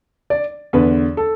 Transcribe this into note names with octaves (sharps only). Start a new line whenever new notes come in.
D5
E2 D3 B4
A4